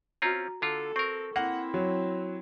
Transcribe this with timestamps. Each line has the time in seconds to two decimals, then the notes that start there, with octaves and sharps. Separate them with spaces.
0.22 C4 C#4 F4 F#4 A#5
0.62 D3 F4 A4
0.96 C4 A#4 C#6
1.36 A#3 C4 E4 F#5
1.74 F#3